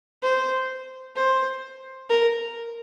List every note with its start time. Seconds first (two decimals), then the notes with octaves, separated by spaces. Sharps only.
0.22 C5
1.16 C5
2.09 A#4